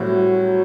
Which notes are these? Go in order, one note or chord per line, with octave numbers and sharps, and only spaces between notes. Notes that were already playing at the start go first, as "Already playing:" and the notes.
Already playing: A2 F#3 G3 C4 F#4